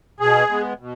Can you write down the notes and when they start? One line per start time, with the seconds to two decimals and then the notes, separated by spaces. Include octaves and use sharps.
0.20 B2 G#4
0.49 G#3 B3
0.80 B2